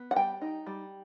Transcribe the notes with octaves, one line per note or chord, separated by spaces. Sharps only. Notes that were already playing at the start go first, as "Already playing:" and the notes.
Already playing: B3
F#5
G3 G5
D#4
G3